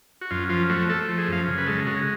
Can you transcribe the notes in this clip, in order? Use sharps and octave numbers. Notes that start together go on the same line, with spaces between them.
F#4
F#2 F4
F3 F4
A3 F#4
A3 A4
F3
G#4
F#2 F5
C#3
B4
G#3 A4
C#3 F#4